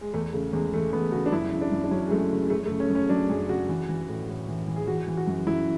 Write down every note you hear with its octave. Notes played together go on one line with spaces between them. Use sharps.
G#3
E2 A3
C#3 A3
E2 G#3
E3 A3
E2 B3
C#3 F#4
D4
F#2 E4
C#3
D4
F#2
D4
F#3 C#4
G#3
F#2 A3
C#3
F#2 A3
A3
C#3
C#4
F#2
C#4
F#3 D4
F#2 G#4
C#3 F#4
E3
E3
A2
A2
E3
E3
G#4
E3 F#4
E3
F#4
F#2
F#2 E4